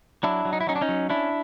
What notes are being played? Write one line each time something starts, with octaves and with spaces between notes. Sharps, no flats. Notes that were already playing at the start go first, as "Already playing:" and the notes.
F#3 D4 E4
F#3
D#4
E4
F#3 C#4 D#4
D4
C#4 D#4
F#3
C#4 D4 E4